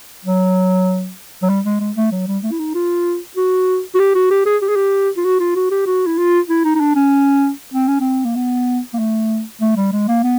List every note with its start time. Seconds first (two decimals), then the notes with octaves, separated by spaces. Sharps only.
0.25 F#3
1.43 F#3
1.50 G3
1.65 G#3
1.81 G#3
1.96 A3
2.12 F#3
2.28 G3
2.44 A3
2.51 E4
2.59 D#4
2.75 F4
3.37 F#4
3.95 F#4
3.99 G4
4.15 F#4
4.31 G4
4.46 G#4
4.62 G4
4.69 G#4
4.76 G4
5.17 F4
5.25 F#4
5.40 F4
5.55 F#4
5.71 G4
5.86 F#4
6.06 E4
6.18 F4
6.49 E4
6.64 D#4
6.75 D#4
6.80 D4
6.96 C#4
7.74 C4
7.88 C#4
8.01 C4
8.25 A#3
8.36 B3
8.94 A#3
8.99 A3
9.61 A3
9.77 G3
9.92 G#3
10.08 A#3
10.23 B3